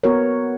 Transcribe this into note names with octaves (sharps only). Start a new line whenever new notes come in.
B3 F#4 A#4 C#5